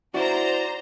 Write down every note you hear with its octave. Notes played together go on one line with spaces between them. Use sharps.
E4 F#4 C5 D5 A#5